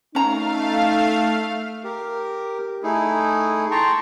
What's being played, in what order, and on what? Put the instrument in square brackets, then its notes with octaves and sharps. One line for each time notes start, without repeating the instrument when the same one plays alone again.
[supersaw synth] A3 F5 [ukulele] C#4 A#5 [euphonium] D#4
[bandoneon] G4 A#4
A3 D#4 E4 G#4
G5 A5 A#5 C6 C#6